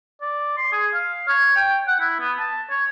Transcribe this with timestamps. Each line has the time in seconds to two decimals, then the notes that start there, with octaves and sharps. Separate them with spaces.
0.22 D5
0.57 C6
0.72 G#4
0.94 F5
1.28 C#5
1.56 G5
1.88 F#5
2.01 E4
2.20 B3
2.39 A5
2.70 C#5